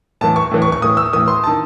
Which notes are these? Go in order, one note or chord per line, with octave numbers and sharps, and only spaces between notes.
A2 E3 A5
C#6
A2 E3
C#6
C#6
A2 E3 D#6
E6
A2 E3 D#6
C6
A5
D#3